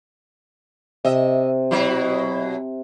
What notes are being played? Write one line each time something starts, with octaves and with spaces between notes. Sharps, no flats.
C3 D#5 E5
B2 F#3 E4